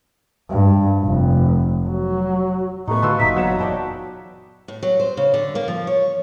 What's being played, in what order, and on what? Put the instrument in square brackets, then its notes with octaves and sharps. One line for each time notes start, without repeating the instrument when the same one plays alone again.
[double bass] G2
F1
F#3
[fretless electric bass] A2 [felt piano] G3 A3 B3 [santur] D#4 [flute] C#6
[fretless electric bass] D3 [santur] F4 F#4 B4 [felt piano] A5 C6 E6
[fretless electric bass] F#1 A#2 [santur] D#4 E5 [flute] B6
[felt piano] E1 F#3 E7 [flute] F#5
[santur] D5 G5 B5 [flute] A5
[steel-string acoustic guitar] A2
F#3
C5
C#3
D3
A#3
F3
C#5